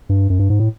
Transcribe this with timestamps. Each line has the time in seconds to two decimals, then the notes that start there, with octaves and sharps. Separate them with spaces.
0.09 G2
0.30 F#2
0.39 G2
0.50 G#2
0.60 A2